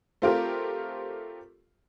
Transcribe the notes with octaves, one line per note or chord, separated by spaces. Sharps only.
A3 C4 F4 G4 A#4